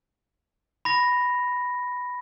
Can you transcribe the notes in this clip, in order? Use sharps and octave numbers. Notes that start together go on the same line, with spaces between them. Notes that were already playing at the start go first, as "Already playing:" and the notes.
B5 A#6